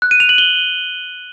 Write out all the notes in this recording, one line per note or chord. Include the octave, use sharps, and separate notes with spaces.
F#6
D#7
F7
F#7
G7